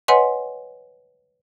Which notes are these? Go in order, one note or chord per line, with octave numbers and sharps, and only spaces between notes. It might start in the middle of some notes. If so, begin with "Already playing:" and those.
B4 C#5 D#5 F#5 G#5 C6